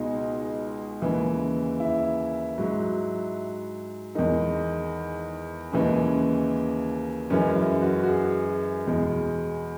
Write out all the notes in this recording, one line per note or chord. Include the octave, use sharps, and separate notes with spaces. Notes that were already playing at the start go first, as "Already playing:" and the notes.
Already playing: C#2 B2 G#3 D#4
D#2 C#3 E3 G#3
E4
G#2 F#3
E2 D#3 G#3 D#4
D#2 C#3 E3 G#3 C#4
F#2 E3 G#3 C#4
E4
F#4
F#4
G#4
E2 B2 G#3